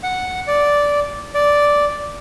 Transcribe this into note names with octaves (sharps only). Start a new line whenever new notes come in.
F#5
D5
D5